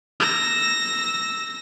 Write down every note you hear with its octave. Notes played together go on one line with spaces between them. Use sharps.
E6 A#6